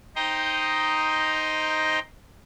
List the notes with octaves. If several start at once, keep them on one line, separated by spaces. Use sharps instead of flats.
D#4 C5 D#5 G5 A#5